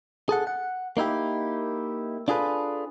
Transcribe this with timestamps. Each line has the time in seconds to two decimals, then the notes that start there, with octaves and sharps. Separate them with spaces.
0.29 G#4 A4 F#5
0.47 F#5
0.97 A#3 D#4 E4 G4
2.28 D4 F4 G#4 A4 B4